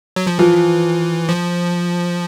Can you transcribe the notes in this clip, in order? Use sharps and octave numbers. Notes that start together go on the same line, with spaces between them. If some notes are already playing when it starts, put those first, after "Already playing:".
F#3
F3
E3 F3
F3